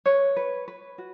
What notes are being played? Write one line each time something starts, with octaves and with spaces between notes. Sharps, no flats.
B4 C#5
B4
B4
F#4